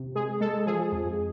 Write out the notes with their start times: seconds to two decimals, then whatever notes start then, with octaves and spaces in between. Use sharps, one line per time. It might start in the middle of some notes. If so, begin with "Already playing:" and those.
Already playing: C3
0.15 G#3 G#4
0.40 G#3 A4
0.67 F3 G#4
0.92 F2